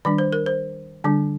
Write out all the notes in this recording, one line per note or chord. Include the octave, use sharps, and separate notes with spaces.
D#3 G3 D4 D5
C5
A#4
C5
D3 G3 D4